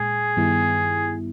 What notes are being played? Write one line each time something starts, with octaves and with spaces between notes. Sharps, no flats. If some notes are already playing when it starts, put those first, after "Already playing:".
Already playing: A#2 G#3 G#4
G2 D#3 G3 B3 E4